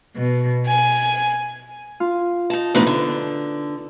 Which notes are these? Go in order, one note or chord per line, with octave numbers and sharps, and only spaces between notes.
B2
G#5
F4
D#4 A5
E2 A2 F3 D4 D#4 B4
D3